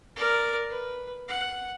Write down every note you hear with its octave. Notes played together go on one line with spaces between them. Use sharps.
A#4 D5
B4
F#5